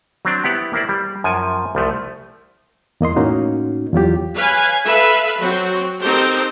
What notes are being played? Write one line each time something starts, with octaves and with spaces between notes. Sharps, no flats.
F#3 C4 D4
B3 E4 G4 F#5
A#3 E4 C5 D5
G3
F#2 F3 G#5
C2 F3 A3
E2 A#3 D#5 C6
A2 A#3 C#4 D#4 F#4
E2 F#3 F4 G4
B4 C#5 F5 G#5
A4 B4 E5 F5
F#3 C4 F#4
C4 D#4 G4 A4 A#4 C5